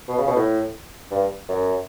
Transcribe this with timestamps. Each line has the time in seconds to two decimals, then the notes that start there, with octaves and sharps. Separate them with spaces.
0.08 B2
0.18 C#3
0.27 B2
0.36 A2
1.11 G2
1.49 F#2